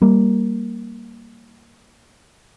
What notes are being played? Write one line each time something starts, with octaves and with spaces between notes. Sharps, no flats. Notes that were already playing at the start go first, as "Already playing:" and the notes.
G3 A#3